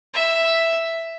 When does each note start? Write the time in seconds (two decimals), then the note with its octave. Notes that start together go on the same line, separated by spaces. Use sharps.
0.14 E5